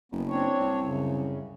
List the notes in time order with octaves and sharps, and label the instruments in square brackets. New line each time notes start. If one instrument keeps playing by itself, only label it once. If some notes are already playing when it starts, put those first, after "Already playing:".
[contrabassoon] F#1 [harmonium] B3
[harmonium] C4 D4 C#5
[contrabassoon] C2
[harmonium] F#2 C#3